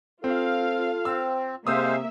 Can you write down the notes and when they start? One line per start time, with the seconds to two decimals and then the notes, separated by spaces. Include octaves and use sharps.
0.24 C4 F4 A4 F5
1.05 C4 E6
1.67 C3 G#3 A#3 C5 E5 F5 D#6 E6